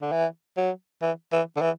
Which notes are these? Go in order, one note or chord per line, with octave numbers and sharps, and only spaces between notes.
D3
E3
F#3
E3
E3
D3
E3